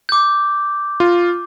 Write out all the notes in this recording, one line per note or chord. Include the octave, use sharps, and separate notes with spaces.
D6 G6
F4